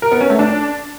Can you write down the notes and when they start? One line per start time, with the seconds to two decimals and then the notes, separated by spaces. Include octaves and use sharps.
0.02 A#4
0.11 B3
0.21 C#4
0.30 A3
0.39 D4